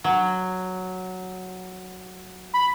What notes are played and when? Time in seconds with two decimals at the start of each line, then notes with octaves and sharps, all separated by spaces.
0.04 F#3
2.54 B5